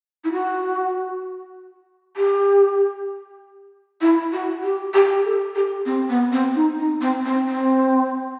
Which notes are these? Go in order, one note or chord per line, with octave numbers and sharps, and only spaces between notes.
E4
F#4
G4
E4
F#4
G4
G4
A4
G4
C4
B3
C4
D#4
D#4
C4
C4
C4